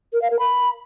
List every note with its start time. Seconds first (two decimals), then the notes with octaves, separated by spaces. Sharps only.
0.12 A#4
0.21 F5
0.30 A#4
0.38 B5